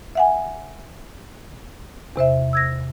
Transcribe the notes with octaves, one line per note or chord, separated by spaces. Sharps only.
E5 F#5 G#5
E2 C3 C5 E5
E6 G#6 A#6